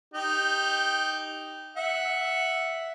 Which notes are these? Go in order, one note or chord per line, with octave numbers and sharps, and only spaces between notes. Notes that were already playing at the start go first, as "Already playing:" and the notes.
D#4 G4
E5 F#5